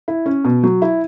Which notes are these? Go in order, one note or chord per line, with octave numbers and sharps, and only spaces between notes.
E4
C#4
B2
F#3
E4